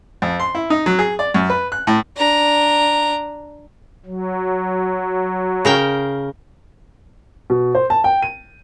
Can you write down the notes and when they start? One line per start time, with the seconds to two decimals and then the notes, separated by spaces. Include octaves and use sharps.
0.22 F2
0.40 C6
0.55 E4
0.70 D#4
0.86 F#3
0.99 G#4
1.19 D5
1.34 F#2
1.50 B4
1.72 F#6
1.87 A2
2.17 D4 A#5
4.06 F#3
5.65 C#3 A#4 G5
7.50 B2
7.75 C5
7.90 A5
8.04 G5
8.22 D#7